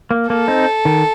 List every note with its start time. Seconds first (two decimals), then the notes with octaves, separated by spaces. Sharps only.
0.11 A#3
0.29 A#3 A4
0.48 C4 D#4
0.85 D#3